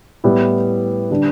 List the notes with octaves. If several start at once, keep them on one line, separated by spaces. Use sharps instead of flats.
A2 G3 B3 E4
D3 G3 D4